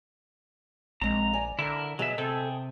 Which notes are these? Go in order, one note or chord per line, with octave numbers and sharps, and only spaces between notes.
A#1 G#3 C4 A#5
D5 G#5
D3 E4 A#4
B2 F#3 G#4 D#5 E5
C3 G#4 A4 G5